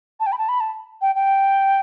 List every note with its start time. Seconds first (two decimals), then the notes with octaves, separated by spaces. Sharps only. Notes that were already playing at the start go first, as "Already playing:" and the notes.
0.20 A5
0.26 G5
0.32 B5
0.38 A5
0.48 B5
0.60 A5
1.01 G5
1.15 G5